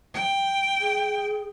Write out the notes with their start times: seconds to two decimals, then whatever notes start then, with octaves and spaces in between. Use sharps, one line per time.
0.14 G5
0.81 G#4